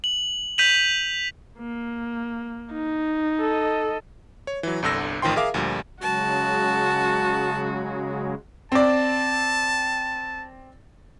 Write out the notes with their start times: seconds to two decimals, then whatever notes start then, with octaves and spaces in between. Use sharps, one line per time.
0.04 F#7
0.58 G6 B6 D#7 F7 F#7
1.59 A#3
2.72 D#4
3.40 A4 D#5
4.47 C#5
4.63 E3 F#3
4.82 G1 C2 D3 E6 A#6
5.22 A1 D#3 F3 G5 C6
5.36 G#4 A#4 E5 F5 D6
5.54 D2 A#2 F3 G3
6.02 C#3 F#3 G#3 F#4 A5
8.72 C4 D5 A5